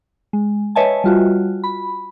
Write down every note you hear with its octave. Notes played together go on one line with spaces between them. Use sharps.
G#3
B4 C#5 D#5 E5 G#5 A5
G3 F4 F#4
B5